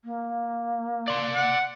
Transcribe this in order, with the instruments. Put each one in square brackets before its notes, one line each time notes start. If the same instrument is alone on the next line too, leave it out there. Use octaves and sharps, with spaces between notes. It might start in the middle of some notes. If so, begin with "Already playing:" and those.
[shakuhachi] A#3
[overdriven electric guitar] D5 C6
[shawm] F#5